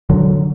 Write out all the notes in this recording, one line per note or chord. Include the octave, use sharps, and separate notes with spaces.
D3 F#3